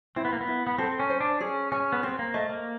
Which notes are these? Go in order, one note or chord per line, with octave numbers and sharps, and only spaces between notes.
C4 E4
B3
A#3
B3
E4
B3
C4 A4
C#4
C5
D4
C#4 G#4
C#4 G#5
B3
C4 C5
A#3
A3 D#5
A#3